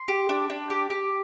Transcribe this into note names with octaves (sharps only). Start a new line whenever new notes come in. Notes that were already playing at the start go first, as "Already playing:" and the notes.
Already playing: C6
G4
D4
D4
G4
G4